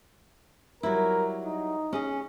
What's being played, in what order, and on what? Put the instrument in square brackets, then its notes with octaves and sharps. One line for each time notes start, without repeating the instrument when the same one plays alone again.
[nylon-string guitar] F#3 G3 E4 [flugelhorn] A#4
[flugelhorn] D#4
[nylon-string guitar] C#4 G#4 D#5